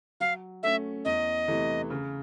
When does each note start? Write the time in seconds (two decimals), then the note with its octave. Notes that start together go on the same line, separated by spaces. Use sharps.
0.20 F#3 F5
0.63 A3 C#4 E5
1.05 E2 D#5
1.48 C3 E3 A3
1.90 C#3